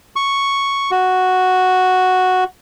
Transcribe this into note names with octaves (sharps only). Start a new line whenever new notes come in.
C#6
F#4